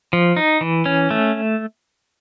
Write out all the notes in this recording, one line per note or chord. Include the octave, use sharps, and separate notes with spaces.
F3
D#4
E3
C#4
A3